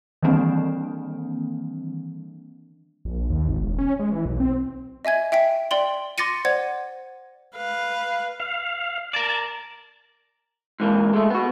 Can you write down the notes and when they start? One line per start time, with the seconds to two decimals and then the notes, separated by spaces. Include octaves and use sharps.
0.22 D#3 E3 G3 A#3 C4 D4
3.05 A#1
3.30 D#2
3.48 G#1
3.62 E1
3.79 C#4
3.99 G#3
4.12 E3
4.25 B1
4.40 C4
5.05 D#5 E5 G#5 G#6
5.32 E5 G5 B6 D7
5.71 D5 G5 C6 F#7
6.18 C6 D6 A6 A#6 C#7 D#7
6.45 C5 D5 F#5 G#6
7.57 B4 F5
8.40 F5
9.13 A#4 D5 A5
10.80 G#2 E3 A#3
11.14 G#3 A3
11.30 B3 F#4